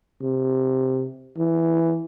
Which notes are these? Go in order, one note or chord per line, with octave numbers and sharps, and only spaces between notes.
C3
E3